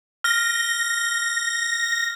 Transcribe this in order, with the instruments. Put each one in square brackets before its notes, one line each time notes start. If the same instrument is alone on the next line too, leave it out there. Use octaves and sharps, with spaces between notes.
[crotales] F6 [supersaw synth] A#6